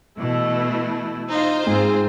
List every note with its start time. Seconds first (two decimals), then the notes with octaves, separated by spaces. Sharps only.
0.19 B2 E3 A3 E4
1.30 D#4 F4 C5
1.67 G#2 C4 G#4